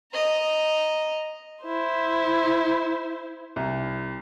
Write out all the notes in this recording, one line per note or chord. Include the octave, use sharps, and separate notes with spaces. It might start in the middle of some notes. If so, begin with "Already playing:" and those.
D#5 A#5
E4 C5
C2